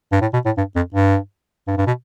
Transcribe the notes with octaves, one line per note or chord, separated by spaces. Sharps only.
G2
A2
B2
A2
G2
F2
G2
G2
G2
B2